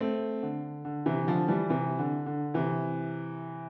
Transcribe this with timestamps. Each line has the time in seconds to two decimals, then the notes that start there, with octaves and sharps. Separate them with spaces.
0.01 A3 C4
0.43 D3
0.85 D3
1.06 C3 E3
1.27 D3 F3
1.48 E3 G3
1.70 C3 E3
1.99 D3
2.26 D3
2.54 C3 E3